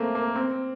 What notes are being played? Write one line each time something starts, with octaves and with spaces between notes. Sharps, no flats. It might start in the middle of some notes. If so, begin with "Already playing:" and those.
Already playing: A3 A#3 C4
A#3
C4